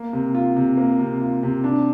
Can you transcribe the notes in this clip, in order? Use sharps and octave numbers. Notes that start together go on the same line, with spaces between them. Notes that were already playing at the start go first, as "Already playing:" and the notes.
Already playing: A#3
C3
F4
C3
A#3
C3
F4
C3
D4